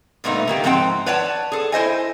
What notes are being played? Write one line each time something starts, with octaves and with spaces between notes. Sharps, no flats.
G2 A#2 A3 B3 D#4
D#3 A#3 G4
G#2 F3 C4 F#5 G5
B4 C#5 D5 F#5 A5
G#4 A4
E4 C5 D#5 G#5